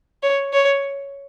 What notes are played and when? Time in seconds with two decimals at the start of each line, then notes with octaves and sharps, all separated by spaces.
0.23 C#5
0.53 C#5